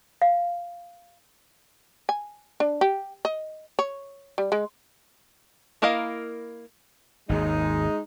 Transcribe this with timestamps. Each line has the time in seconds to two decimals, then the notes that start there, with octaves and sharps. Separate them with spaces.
0.22 F5
2.09 G#5
2.60 D4
2.81 G4
3.25 D#5
3.79 C#5
4.38 G3
4.52 G#3
5.82 A#3 E4 A#4 D#5 F5
7.29 G#1 D#2 G#2 G#3 D#4